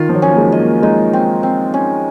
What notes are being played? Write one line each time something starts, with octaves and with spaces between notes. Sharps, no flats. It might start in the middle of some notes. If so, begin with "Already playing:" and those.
Already playing: D#3 F4
F3
F#3
C#4
A#3
G#3
D#5
A#3
G#3 D#4
C4
C4
C#4